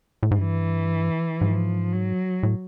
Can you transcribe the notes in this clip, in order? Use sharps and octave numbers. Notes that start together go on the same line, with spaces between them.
A2
G#2
G2 E3
G#2 F3
F#3
A2